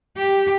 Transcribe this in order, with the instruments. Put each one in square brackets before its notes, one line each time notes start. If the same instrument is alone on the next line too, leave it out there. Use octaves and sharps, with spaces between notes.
[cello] G4